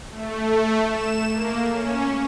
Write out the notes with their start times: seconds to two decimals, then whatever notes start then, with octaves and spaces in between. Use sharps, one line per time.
0.10 A3
0.49 A3
0.87 E7
1.32 A#3
1.70 C#4